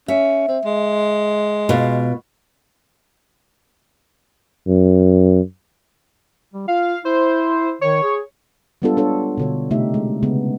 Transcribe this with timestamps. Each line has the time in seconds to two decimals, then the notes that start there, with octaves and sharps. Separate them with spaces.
0.08 C#4 E5
0.48 C4
0.65 G#3
1.69 B2 F4
4.67 F#2
6.54 G3
6.68 F4 F5
7.05 E4 C5
7.81 D#3 C#5
8.03 G#4
8.82 G3 G#3 B3 D4 F4 A4
8.97 D4 A4 C#5
9.37 B2 D3 C#5
9.71 C3 A3 D#4 G4 E5
9.94 G#3
10.23 C#3 G#3 B3